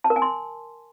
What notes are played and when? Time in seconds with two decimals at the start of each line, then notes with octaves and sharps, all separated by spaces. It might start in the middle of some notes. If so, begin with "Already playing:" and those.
0.04 A5
0.10 A#4
0.16 G#5
0.22 C6